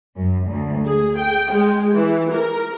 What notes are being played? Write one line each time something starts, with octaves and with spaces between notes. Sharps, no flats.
F#2
D2
G#4
G5
G#3
E3
A#4